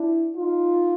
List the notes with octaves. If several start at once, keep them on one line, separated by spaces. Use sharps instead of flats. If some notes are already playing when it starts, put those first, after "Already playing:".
Already playing: D4 E4
D#4 F4